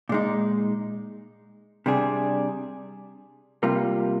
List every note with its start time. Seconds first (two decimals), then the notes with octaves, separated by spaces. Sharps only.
0.09 A#2 G#3 D#4
1.86 C3 G3 D4 G#4
3.63 C3 G3 A#3 F4